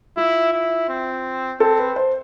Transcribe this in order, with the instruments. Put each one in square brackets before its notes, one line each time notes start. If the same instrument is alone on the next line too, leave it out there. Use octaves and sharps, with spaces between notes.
[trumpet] E4 [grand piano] F4
[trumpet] E4
C4
[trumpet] C4 [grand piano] A4
[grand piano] B4
C5